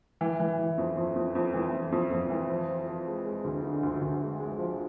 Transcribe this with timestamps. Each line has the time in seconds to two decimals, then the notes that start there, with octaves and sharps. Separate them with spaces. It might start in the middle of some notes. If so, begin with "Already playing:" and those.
0.21 E3
0.40 E3
0.59 E3
0.78 F2
0.97 F2
1.16 F2
1.35 F2
1.54 E3
1.73 F2
1.92 F2
2.11 F2
2.30 E3
2.49 F3
2.68 F3
2.87 F3
3.06 G#3
3.26 G#3
3.44 D2
3.63 D3
3.83 D2
4.01 D2
4.21 G#3
4.40 G#3
4.59 F3